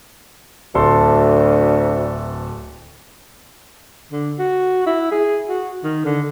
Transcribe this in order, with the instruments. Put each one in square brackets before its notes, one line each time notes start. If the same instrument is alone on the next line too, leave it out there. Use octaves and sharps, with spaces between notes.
[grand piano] D1 A4 C6 [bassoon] D2
[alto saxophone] D3
F#4
E4
G#4
F#4
D#3
D3